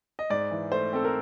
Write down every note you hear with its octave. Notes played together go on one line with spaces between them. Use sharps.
D#5
G#2 D5
E3
A3 C5
C4 A4
A#4